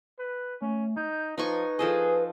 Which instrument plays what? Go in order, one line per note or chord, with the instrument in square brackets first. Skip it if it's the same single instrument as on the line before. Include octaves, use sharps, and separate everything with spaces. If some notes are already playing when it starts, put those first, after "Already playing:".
[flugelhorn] B4
[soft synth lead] A3 [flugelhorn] C#4
[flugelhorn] D#4 [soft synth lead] G6
[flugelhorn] F3 [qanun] D#4 G#5 C#6 [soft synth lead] B4
[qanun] F3 A4 D#5 [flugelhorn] G#4